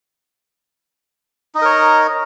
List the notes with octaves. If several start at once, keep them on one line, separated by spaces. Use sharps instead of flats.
D#4 A#4 C#5 D#5